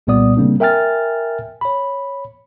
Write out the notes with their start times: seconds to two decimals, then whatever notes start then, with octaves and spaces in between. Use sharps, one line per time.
0.07 C2 A#2 G3 B3 D5 D#6
0.37 C#3 G3 A#3 C4 D4
0.60 A#4 E5 G5 G#5 F6 A6
1.61 C#5 B5